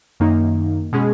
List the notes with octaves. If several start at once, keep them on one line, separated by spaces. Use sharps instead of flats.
F#2 D#3 A#3 D#4
B2 G#3 C#4 G#4